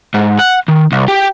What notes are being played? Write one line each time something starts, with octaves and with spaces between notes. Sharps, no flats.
G#2
F#5
D#3
C2
G4